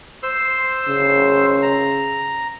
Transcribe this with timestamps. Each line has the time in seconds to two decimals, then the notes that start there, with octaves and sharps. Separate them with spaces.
0.23 C5 C6 E6
0.88 C#3
1.62 A#5